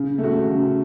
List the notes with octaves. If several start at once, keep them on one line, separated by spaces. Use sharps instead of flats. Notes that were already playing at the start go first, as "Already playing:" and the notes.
Already playing: C#3
A3
F#4
C#3